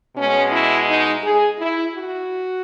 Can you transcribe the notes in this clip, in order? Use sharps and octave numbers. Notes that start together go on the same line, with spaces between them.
B2 G#3 C#4
E4
D#4
G#4
E4
F#4